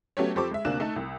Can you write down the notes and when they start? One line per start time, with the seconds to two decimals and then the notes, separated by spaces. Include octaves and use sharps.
0.17 F#3 A3 B3 C#4 G4 C#5
0.35 F2 G4 A4 C5 C#6 D6
0.51 G#3 E5
0.65 D2 C3 A#3 D4 F#6 E7
0.80 A3 D#4 A4
0.96 C2